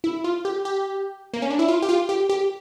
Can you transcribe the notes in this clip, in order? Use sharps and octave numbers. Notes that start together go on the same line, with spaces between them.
E4
F4
G4
G4
A#3
C#4
D4
E4
F4
G4
F4
G4
G4